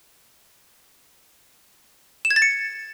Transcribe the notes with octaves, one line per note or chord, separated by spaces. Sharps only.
E7
G#6
A6
C#7